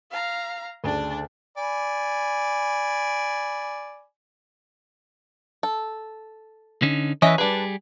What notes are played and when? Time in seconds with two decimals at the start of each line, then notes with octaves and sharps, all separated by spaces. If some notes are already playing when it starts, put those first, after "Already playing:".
0.11 F5 A#5
0.84 D2 C#3 D4 D5
1.58 D5 G#5 B5
5.63 A4
6.82 D3 C#4 D#4
7.22 E3 C#4 B4 D#5 E5
7.38 G3 D4 G4 G#4 B4